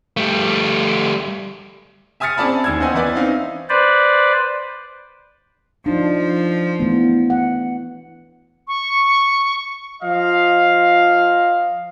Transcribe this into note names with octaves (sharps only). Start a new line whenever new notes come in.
G3 A3
E5 G#5 D#6 F6 A6 C#7
C4 C#4 G#4 D5 A5 B5
D#2 E6 G#6
B3 C#4 C5 D#5 F#5 G#5
E3 B3 E4 B4 D5
C4 C#4 D#4 F5
B4 C5 D5
F3 D4 D#4
E3 A3 B3
F#5
C#6
F3 F4 D#5 F5